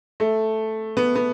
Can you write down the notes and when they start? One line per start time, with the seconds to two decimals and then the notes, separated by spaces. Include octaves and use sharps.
0.20 A3
0.97 B3
1.15 B3